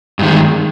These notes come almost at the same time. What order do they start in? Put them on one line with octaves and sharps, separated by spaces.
G2 D#3 G#3